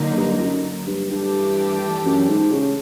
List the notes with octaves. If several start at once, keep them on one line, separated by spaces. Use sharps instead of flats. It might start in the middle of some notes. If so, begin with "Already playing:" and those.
Already playing: D3 F#3 A#3 D#4
G2
G2
F#2
G2
G2 E3 A3 D4 G4
F#2
G#2
C#3